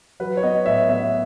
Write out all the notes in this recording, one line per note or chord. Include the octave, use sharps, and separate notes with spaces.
F#3 B4
C#5
B3 D#5
A2 E5
B3 E5